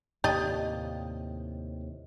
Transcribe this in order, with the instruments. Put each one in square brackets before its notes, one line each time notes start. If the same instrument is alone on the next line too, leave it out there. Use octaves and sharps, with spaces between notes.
[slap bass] D#2 A2 C3 [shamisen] G4 D5 D#5